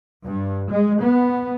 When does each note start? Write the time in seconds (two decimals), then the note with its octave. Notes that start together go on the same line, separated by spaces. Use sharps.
0.25 G2
0.71 G#3
0.99 B3